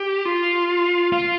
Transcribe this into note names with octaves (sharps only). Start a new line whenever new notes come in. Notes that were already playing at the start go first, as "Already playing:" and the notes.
Already playing: G4
F4
F4